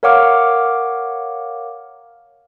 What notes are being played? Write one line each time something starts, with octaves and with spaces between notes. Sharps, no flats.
A#4 C#5 F5 F#5 D6 F6